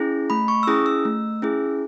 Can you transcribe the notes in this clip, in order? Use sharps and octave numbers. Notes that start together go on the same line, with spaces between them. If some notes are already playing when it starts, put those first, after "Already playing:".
Already playing: C#4 E4 G#4
A3 B5
C#6
E6
C#4 E4 G#4 D#6
E6
A3
C#4 E4 G#4